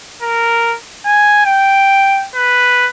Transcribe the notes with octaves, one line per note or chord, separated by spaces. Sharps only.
A#4
G#5
G5
B4